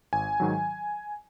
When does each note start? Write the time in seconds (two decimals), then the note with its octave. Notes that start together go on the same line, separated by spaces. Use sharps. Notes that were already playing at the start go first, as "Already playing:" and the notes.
0.13 G#1 G#5
0.40 G#2 D#3 F#3